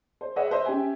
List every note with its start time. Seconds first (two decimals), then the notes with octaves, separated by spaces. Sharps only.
0.21 C5
0.36 G#4 B4 C#5 D#5 E5 F#5
0.51 B4 C5 D#5 E5 C6
0.65 C#4 G4 E5 G5 G#5